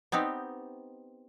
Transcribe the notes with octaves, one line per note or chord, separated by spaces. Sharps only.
B3 C4 D#4 G4